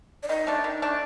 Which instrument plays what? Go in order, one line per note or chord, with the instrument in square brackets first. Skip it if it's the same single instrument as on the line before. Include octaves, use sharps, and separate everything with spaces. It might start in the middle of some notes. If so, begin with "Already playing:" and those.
[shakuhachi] D5
[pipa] D#3 [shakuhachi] D#5
[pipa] A3 D4
D#3
A3 D4